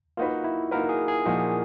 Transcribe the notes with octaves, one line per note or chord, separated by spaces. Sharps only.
A#3 D#4 F4 F#4 B4
E4
A#3 D#4 F#4 A#4 B4
G#4
G#4
A#2 F3 A#3 D#4 F#4